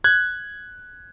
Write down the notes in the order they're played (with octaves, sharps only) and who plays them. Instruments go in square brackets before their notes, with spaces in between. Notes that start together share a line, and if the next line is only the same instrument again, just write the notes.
[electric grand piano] F#6 G#6